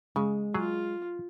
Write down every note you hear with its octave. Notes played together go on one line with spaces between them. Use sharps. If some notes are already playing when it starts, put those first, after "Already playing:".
C#3 G#3
F#3 F4 G#4